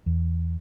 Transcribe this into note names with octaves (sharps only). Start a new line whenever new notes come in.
E2